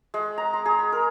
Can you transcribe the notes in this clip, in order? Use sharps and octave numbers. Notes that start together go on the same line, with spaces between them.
G#3
A#5
C6
G#4
B5
A#4